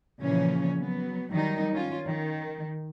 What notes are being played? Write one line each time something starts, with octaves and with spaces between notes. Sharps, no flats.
A#2 C#3 E3 F3 C#4
F#3 B3
D#3 F#3 G3 D#4
C#4 F4
D#3